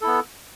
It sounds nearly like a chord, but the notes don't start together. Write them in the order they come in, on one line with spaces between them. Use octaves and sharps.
A4 E4 B3